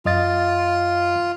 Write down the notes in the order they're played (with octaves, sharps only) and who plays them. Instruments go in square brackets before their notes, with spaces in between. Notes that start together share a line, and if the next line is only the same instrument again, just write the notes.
[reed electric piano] F#2 D#5 A6 [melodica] F4